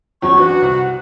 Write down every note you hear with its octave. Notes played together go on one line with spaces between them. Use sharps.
E2 F#3 C#4 C#6
C4 D4 F#4 B4
C2